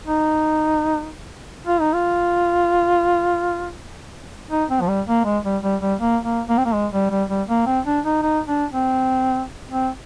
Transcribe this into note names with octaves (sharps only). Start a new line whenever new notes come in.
D#4
F4
D#4
F4
D#4
C4
F3
G3
A#3
G#3
G3
G3
G3
A#3
A#3
A#3
C4
A#3
G#3
G3
G3
G3
A#3
C4
D4
D#4
D#4
D4
C4
C4